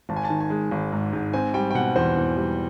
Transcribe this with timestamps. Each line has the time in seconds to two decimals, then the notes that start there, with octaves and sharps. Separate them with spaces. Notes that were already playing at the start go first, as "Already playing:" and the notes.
0.09 G#1 A5
0.16 G#5
0.24 A5
0.30 D#3
0.41 G#5
0.50 G#3
0.71 G#1
0.92 G#2
1.13 G#2
1.33 C4 G#5
1.54 G3 G5
1.71 G5
1.74 B2 F#5
1.96 E2 C5
2.17 E2
2.37 G3